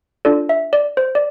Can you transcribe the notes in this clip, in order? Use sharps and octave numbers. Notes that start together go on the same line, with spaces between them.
D4 F4 A4 D5
E5
D5
C5
D5